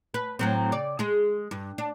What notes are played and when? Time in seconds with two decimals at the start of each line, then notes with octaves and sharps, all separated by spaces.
0.14 B4
0.39 A2 F#3 C4
0.72 C#3 D5
0.99 G#3 G#4
1.51 G2
1.78 D4